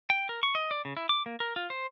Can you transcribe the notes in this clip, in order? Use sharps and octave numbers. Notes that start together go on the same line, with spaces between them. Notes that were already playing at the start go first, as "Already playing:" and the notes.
G5
A#4
C#6
D#5
D5
C#3
E4
D6
A#3
A#4
F4
C5